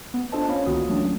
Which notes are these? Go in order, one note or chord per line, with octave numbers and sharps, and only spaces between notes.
B3
D4 F4 A4 C5 D#5 A5
B3 C#4 C#5 F5 B5
C#2 D#3 A#3 F4 F#4 D#6
E3 F#3 A3 C#4 D4